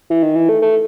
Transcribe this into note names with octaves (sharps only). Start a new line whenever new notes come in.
E3
D#3
E3
A3
A3